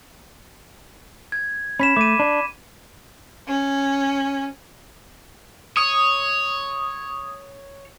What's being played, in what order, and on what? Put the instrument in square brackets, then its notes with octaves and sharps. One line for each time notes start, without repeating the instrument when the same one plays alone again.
[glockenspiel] G#6
[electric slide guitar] C#4 [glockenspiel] B5 B6 E7
[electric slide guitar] A3 [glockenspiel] D6 D#7
[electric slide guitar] D4
[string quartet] C#4
[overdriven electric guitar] C#5 [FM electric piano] D#6